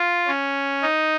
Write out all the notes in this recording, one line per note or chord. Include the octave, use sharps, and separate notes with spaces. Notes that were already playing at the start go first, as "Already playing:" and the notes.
Already playing: F4
C#4
D#4